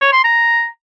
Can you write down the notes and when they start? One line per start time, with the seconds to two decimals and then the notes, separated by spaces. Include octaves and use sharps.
0.01 C#5
0.13 C6
0.24 A#5